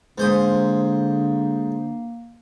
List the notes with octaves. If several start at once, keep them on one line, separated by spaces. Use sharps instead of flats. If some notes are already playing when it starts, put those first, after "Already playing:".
G#2 D3 A#3 C5 D#6